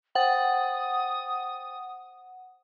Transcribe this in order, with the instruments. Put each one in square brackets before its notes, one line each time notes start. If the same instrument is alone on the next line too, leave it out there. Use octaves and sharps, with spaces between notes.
[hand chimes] C5 G5 A6 [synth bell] F#5 [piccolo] D#6